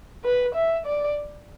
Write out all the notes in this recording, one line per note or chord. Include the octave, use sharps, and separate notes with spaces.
B4
E5
D5